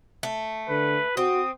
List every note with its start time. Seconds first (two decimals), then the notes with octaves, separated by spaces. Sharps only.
0.23 A3
0.69 D3 B4
1.17 C4 F#4 D#6